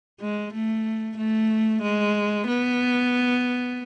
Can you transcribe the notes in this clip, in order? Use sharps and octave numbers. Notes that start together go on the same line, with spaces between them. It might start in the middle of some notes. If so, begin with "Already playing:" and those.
G#3
A3
A3
G#3
B3